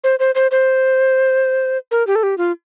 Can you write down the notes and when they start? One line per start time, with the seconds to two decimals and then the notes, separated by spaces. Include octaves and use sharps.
0.04 C5
0.19 C5
0.35 C5
0.51 C5
1.91 A#4
2.07 G4
2.15 A4
2.23 G4
2.38 F4